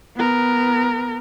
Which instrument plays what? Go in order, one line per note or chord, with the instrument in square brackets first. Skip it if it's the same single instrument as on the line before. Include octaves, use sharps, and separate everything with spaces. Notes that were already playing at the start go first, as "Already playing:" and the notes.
[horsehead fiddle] B3 A#4